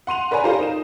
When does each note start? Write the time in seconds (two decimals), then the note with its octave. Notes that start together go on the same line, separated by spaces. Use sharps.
0.07 F#5 C6 D#7 F7
0.31 A#4 B4 C#5 D5 G#5 A#5
0.44 F4 G4 A4 A#4 C5 F5
0.59 D#4 E7